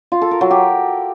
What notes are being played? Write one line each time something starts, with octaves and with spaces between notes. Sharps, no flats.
F4
A4
A#4
F#3
G4